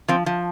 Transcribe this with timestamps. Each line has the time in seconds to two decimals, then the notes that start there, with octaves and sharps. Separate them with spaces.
0.08 F3 C4
0.26 F3